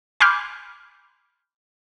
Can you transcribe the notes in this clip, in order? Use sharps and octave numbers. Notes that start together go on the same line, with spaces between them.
G#5 B5 C6 D6 F6 G6